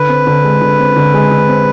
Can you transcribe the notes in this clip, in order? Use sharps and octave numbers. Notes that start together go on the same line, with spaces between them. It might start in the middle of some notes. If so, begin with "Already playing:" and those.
Already playing: D3 B4
C4
D3
G#3
D3
C4
D3
G#3
D3
C4